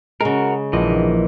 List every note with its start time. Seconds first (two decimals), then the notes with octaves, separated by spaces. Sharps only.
0.21 C#3 G#3 F#4 A#4
0.73 A#1 E3 D#5